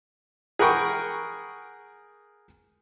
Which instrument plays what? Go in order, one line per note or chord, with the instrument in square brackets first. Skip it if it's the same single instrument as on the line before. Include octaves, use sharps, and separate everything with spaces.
[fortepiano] G#4 A#4 F#5 G5 B5 C#6